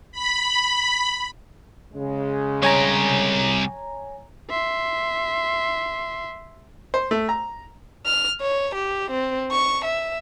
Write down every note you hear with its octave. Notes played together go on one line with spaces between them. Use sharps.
B5
C#3 G#3
C2 G4 C#5 G#5 A#5
E5 C6
C5
A3
A#5
F6
C#5
G4
C4
C#6
E5